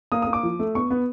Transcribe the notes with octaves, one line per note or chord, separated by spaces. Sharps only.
A#3 D#6
D#6
A#3
D6
F3
A3
B3 C#6
B3